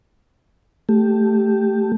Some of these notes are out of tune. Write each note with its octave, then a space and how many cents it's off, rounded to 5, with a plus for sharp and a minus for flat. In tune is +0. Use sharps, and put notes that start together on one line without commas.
A3 +0 G4 +0